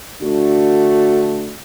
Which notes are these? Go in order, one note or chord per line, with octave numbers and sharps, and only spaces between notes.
D3 A3 D4 F#4